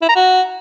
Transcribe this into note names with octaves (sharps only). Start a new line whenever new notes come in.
E4
A#5
F#4